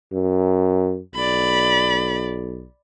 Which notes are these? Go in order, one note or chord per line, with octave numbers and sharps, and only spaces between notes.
F#2
B1 D5 B5